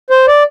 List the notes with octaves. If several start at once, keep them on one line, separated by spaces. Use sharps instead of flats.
C5
D5